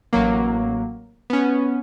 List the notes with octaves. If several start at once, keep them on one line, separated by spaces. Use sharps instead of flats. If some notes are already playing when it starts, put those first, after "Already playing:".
A1 F#3 A#3
B3 C#4